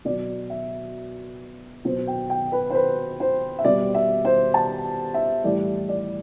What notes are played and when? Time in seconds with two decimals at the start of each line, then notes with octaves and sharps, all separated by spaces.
0.05 B2 F#3 D5
0.50 E5
1.85 B2 F#3 C5
2.07 G5
2.30 G5
2.52 B4
2.70 C5
2.75 B4
3.20 C5
3.59 E5
3.65 B2 G3 D5
3.95 E5
4.25 C5
4.54 A5
5.14 E5
5.44 A2 E3 G3 D5
5.89 D5